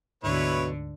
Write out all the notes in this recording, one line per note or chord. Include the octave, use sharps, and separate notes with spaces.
D2 G#2 B2 D3 E4 B4 C#5